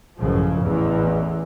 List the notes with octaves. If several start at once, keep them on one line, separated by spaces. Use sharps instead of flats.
A1 F#2 C#3 F3
A1 E2 E3